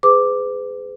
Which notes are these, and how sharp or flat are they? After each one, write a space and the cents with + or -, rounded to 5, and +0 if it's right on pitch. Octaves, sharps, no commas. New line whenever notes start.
G#4 +0 B4 +40 D6 +0